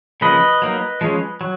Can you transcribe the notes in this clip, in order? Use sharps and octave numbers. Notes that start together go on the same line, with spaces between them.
C#3 F3 A#3 B4 D#5
F#3 A#3 D#4
F3 G#3 C#4
F#3